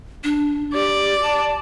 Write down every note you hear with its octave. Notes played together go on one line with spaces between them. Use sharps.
D4
G4 D5
A5